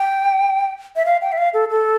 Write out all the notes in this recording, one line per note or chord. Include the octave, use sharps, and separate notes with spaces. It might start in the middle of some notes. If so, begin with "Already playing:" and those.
Already playing: G5
E5
F5
G5
E5
F5
A4
A4